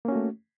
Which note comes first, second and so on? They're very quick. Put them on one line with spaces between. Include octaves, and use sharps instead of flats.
A#3 C#4 F#4 A3